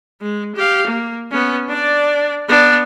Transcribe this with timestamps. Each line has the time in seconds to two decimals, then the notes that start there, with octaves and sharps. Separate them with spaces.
0.21 G#3
0.55 G4 F5
0.86 A#3
1.31 B3 C#4
1.69 D4 D5
2.48 B3 D4